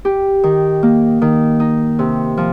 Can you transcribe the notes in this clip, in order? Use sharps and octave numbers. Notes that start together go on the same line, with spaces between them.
G4
D#3
A#3
D#3
D#4
C3
F3